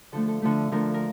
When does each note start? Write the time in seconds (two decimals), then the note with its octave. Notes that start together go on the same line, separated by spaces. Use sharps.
0.12 D3 F3 A3 A4
0.28 A4
0.42 D3 F3 A3
0.71 D3 F3 A3 A#4
0.94 A#4